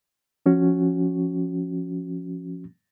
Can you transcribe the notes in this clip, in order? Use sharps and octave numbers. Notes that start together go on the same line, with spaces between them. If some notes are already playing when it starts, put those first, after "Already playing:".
F3 C#4 F#4